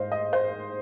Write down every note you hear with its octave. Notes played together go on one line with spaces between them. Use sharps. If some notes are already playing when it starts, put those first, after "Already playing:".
Already playing: G#2 G#3 C5 D#5 F5
D#5
C5